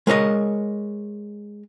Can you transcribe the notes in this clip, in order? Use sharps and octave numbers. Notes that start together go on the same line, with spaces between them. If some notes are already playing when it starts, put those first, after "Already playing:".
G#3 A#4 C#5 D#5